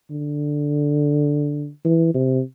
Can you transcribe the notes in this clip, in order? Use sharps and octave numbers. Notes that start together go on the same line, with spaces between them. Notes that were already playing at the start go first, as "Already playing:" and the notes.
D3
E3
C3